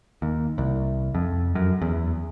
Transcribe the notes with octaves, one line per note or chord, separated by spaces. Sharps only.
D#2
C2
F2
F#2
E2